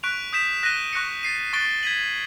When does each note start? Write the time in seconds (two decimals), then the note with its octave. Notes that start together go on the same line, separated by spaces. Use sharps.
0.03 C#6 F#6 B6 D7 F7
0.33 D#6 G6 B6 E7
0.63 F#6 A#6 D#7 G7
0.93 C#6 F#6 A#6 C#7
1.23 A6 C7 D#7
1.53 C#6 F#6 A6 D7 G7
1.83 G#6 B6 D#7 F#7